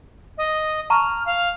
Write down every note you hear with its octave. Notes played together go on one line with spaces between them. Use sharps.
D#5
A5 A#5 C#6 F6
F5